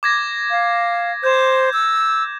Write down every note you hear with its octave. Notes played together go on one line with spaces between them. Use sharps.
D6 G#6 A#6
F5
C5 G6 G#6 E7
E6